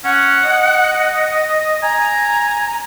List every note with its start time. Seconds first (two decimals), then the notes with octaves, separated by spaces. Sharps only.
0.04 C#4 F#5
0.44 D#5
1.82 G#5 A#5